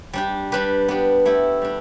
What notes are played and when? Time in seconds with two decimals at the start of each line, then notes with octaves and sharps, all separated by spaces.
0.13 G3 D4 G4
0.52 G3 D4 G4 B4
0.88 B3 D4 G4
1.25 A3 E4 G4
1.62 G3 D4